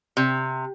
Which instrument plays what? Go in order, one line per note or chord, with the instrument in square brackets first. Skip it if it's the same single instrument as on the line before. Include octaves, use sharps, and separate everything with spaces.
[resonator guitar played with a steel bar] C3